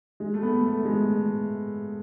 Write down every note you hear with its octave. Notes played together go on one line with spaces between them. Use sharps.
G#3
A3
B3
A3
G#3